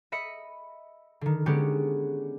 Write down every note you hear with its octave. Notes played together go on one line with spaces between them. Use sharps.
D#5 E5 B5 C#7
D3 D#3
D3 G#3 B3 C#4 G4